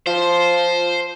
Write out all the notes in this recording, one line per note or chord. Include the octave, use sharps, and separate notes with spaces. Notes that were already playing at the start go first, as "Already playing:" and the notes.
F3 C5